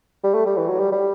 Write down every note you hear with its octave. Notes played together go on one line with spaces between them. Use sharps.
G3
A3
G3
E3
F#3
G3
G3